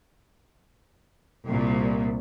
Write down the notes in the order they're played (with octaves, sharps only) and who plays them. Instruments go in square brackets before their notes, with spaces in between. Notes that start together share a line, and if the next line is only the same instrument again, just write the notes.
[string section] C2 A#2